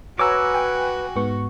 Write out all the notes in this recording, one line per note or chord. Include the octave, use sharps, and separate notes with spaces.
F#4 B4 C#5 G#5 A#5 D6 E6
G5 G#5
G#2 B3 C#6